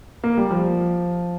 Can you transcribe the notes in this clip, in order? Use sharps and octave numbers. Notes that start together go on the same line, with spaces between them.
A#3
G3
F3